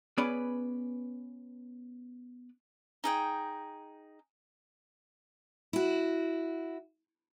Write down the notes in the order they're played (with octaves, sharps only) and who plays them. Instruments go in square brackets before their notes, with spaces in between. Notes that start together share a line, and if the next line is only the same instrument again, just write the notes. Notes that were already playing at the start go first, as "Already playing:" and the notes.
[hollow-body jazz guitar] B3 C#4 G#4 B4 D5
[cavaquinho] D#4 G#4 G5
[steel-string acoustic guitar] E4 F#4